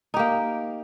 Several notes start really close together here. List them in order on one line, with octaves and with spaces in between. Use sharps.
D#4 G4 A#3